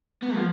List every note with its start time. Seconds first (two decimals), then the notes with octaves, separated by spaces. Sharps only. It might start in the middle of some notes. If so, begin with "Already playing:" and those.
0.22 B3
0.35 F3